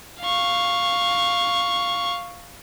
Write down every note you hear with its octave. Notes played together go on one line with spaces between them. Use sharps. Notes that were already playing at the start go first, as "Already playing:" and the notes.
F5 C#6